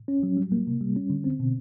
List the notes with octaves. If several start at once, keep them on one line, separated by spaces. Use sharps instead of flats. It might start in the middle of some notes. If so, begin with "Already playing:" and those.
C#4
F#3
G3
A#3
C3
G3
C#4
D3
C4
B2